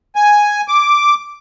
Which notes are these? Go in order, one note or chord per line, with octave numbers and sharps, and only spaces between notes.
G#5
D6